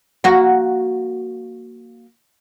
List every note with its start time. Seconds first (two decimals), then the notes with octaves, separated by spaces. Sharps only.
0.24 A#3 F#4